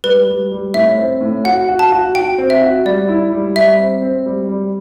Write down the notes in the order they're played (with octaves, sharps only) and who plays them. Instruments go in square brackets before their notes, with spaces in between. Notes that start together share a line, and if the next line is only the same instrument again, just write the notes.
[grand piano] G3 [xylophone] B4
[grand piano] G3
G3
[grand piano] A2 [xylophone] E5
[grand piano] C4
A2
[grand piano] F#4 [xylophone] F#5
[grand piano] F#4
[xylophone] A5
[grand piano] F#4
[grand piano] F#4 [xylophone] G5
[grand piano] C4
[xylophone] E5
[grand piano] F#4
[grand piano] G3 [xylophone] D5
[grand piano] E4
G3
[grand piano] G3 [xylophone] E5
[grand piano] C4
C4
G3
G3